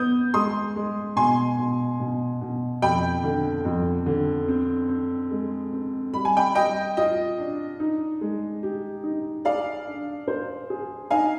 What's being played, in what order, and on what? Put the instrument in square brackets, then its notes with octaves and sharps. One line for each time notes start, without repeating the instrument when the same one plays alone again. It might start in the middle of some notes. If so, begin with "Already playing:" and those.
Already playing: [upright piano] B3 [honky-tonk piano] D#6 G6
[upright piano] G#3 [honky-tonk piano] C6 D#6
[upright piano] G#3
[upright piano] B2 [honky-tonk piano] G#5 C6
[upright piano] B2
B2
B2
[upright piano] F2 [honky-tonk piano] G5 B5
[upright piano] D3
F2
D3
C4
C4
G#3
C4
[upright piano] G3 [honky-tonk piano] B5
[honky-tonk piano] G#5
G5 B5
[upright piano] G3 [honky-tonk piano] D#5 G5
[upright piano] F4 [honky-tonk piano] D#5
[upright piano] D4
D#4
G#3
G4
D#4
[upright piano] G#4 [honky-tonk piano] D5 F5
[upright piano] D4
C5
G#4
[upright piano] D#4 [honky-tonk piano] F5 G#5